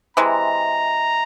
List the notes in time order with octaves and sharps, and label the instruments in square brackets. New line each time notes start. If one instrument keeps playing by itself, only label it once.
[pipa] C3 E3 G#3 [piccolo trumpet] A#5